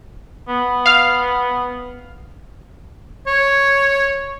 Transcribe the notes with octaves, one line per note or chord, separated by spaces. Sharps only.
B3
F5 F6
C#5